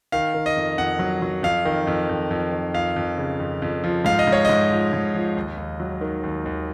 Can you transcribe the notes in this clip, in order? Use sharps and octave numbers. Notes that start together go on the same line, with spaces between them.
D#3 F5
D#3
D#5
F2
F2 F#5
F#3
F#3
F2 F5
D#3
F2
F2
F2
D#3
F2 F5
F2
C#3
F2
F2
F3
G#2 F5
D#5
G#2
C#5
G#2 D#5
F3
G#2
F3
D#2
D#2
F#3
D#3
D#2
D#2